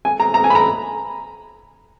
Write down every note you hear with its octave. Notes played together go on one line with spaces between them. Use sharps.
G#5
A#5
A#5
G#5
B5
A#5